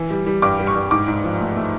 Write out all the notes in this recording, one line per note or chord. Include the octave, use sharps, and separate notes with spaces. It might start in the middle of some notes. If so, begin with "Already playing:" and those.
Already playing: E3
G3
G3
G2 D6
G3
C#6
G2
G#2 D6
G#2
F3
A3
A3